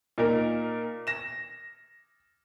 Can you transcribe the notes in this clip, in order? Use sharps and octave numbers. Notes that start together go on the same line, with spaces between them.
A#2 D#4 A#4
A#6 E7